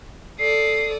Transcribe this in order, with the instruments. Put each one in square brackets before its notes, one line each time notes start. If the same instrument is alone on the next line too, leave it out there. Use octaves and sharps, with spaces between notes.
[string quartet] A4 D5 D#6 [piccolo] C7